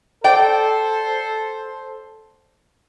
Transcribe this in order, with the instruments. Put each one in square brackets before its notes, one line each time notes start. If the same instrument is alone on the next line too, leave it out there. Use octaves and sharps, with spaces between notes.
[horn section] A4 C5 [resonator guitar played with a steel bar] D5 G5